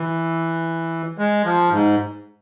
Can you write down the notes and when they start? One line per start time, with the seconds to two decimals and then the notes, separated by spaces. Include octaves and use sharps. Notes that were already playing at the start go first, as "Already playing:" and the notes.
Already playing: E3
1.18 G#3
1.45 F3
1.71 G#2